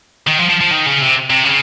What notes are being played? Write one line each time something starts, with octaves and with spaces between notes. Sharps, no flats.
D#3
F3
F3
F3
D#3
C#3
C3
C3
C#3